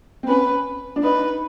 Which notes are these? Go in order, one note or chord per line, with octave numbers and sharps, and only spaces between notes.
C4
C#4 B4
D4
D#4 B4